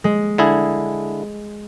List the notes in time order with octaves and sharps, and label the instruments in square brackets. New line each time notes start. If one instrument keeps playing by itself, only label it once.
[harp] G#3
[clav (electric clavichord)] D3 E4 G#4